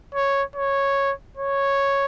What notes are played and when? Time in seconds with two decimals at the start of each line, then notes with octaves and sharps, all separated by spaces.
0.14 C#5
0.56 C#5
1.37 C#5